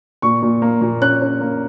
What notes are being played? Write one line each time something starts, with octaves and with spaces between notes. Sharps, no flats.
A#2 C#6
A#2
A#3
A#2
C#4 F#6
C#4
A#3